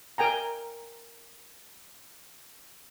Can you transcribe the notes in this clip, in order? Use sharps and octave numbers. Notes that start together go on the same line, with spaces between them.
A#4 G5 G#5 A#5